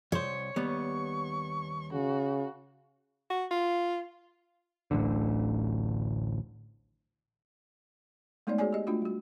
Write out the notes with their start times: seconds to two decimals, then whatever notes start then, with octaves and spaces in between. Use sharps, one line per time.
0.12 C2 C5 C#5
0.56 D#2 G3 B3 C#6
1.93 C#3 F#4
3.30 F#4
3.51 F4
4.91 D1 A1 D2 D3
8.47 G#3 A3 B3 D#4 C#5 D5
8.58 F#4 G#4 C#5 D5 G#5
8.73 G4 D#5
8.87 A3 D4 F4 F#4
9.02 G3 F#4